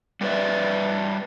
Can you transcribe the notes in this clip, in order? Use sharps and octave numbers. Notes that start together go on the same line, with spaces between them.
G3 A3 G4 B4 D5 E5